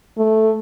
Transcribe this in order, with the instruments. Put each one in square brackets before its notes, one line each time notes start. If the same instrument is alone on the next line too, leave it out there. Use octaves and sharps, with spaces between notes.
[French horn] A3